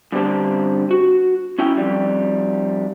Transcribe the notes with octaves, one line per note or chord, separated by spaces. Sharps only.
G2 D3 C4 G4 A5
F#4
C#4 E4 G5
F2 G3